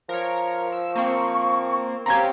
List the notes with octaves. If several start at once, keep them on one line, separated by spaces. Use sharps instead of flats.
F3 A#4 C#5
E6
A#3 C4 C#6
C4 C#4 G4 F5 A#5 G#6